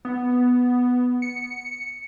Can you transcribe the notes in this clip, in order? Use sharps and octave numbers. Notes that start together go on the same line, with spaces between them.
B3
C#7